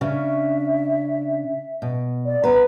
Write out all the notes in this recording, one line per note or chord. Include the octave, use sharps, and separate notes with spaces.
C#3 C#4 D4 E5
B2
D5
D2 B3 B4 A#5